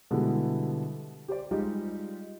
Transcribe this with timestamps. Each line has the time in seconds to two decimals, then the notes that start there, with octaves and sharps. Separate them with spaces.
0.11 B2 D3 G3 G#3 B3 E4
1.28 G4 C5 D5
1.51 G3 G#3 D#4 F4 G4